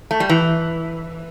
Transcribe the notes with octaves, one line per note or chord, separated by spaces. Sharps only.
A3
G3
E3